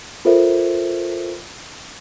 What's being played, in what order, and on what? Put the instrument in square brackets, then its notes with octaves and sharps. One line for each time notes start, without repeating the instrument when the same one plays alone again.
[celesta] F4 A4 A#4 C5 E5